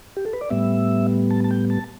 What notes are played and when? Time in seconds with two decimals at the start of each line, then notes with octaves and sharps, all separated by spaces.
0.17 G4
0.25 A4
0.33 B4
0.41 D5
0.50 A2 G3 B3 E5
1.31 A5
1.44 A5
1.51 G5
1.70 A5